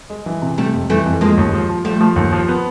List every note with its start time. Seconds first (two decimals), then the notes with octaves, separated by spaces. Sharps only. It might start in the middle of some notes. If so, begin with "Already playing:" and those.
0.10 G#3
0.26 E3
0.42 C3
0.58 C3 G3 A3
0.73 F2
0.90 E3 G3 A3
1.06 F2
1.21 F3 G#3 A#3
1.37 D#2
1.53 F3
1.69 F3
1.84 F3 G3 A3
2.01 F3
2.16 D#2
2.33 F3
2.48 B3